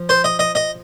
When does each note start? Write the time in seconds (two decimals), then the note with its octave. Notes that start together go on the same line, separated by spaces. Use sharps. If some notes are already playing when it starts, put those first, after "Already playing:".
Already playing: F3
0.09 C5
0.24 D#5
0.39 D#5
0.55 D#5